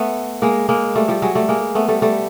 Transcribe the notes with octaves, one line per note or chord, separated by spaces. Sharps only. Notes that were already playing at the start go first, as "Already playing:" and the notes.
Already playing: A3 B3
G#3 A#3
G#3 A#3
G3 A3
F3 G3
F#3 G#3
G3 A3
G#3 A#3
A3 B3
G3 A3
G3 A3